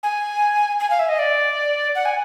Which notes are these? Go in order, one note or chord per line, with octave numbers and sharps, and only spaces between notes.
G#5
G#5
F5
E5
D#5
D5
F#5
G#5